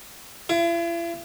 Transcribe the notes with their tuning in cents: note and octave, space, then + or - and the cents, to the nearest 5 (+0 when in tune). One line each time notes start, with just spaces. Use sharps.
E4 +45